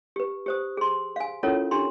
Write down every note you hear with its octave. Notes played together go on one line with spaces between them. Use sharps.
G4 B4
G4 C5 D#6
G#4 C6
F5 G#5
C#4 E4 F4 A4 A#4 C#5
D4 G4 A#5 C6